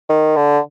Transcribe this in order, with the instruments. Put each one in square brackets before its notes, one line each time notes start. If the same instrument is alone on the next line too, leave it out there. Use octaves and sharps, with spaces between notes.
[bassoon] D#3
D3